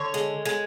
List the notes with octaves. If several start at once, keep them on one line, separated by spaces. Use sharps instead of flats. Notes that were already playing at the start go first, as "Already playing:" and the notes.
Already playing: D3 C#5
G#3
G#3